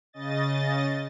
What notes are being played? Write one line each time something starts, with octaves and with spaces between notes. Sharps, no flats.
C#3 D#5 A6